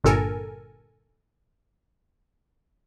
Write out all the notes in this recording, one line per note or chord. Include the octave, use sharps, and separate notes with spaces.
G1 G2 A#2 A4 A#4 G#5